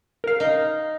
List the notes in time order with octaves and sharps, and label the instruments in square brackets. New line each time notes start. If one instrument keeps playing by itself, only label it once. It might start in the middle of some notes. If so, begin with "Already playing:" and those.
[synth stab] A#4 F5
[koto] D#4